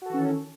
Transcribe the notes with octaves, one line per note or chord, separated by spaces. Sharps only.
D#3 E3 C#4 F#4 A4